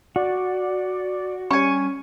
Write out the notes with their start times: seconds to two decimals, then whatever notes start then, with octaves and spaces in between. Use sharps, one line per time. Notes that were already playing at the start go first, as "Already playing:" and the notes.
0.16 F#4 D5
1.51 G3 C#4 C#5 G#5 C#6